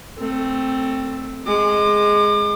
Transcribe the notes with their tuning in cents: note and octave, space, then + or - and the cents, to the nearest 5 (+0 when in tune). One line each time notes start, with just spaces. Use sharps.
A3 +15 C4 +0
G#3 +0 D6 +40